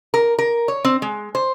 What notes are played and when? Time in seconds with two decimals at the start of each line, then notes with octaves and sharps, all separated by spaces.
0.14 A#4
0.39 A#4
0.68 C#5
0.85 C4
1.02 G#3
1.35 C5